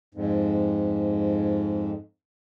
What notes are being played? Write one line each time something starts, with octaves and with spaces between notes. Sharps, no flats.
F2 G#2